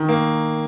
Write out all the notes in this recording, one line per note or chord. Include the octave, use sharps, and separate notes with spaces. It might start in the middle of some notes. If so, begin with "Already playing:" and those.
Already playing: D#3
A#3